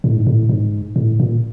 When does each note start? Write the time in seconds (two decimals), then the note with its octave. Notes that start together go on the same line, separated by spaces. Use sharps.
0.04 A2
0.16 G#2
0.27 A2
0.49 G#2
0.96 A2
1.20 A#2